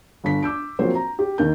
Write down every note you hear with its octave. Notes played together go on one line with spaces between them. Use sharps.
G1 B6
D6 E6 G6 D7
F3 F#3 A#3 C4 F#4 C5
A#5
G4
D#2 D#3 A#4 G6